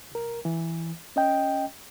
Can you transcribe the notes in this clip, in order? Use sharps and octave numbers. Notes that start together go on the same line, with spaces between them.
C2 A#4
E3
C#4 D#5 G5